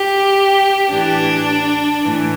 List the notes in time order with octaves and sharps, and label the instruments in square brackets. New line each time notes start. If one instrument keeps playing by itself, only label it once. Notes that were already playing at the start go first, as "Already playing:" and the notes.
Already playing: [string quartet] G4
A2 E3 D4
A2 E3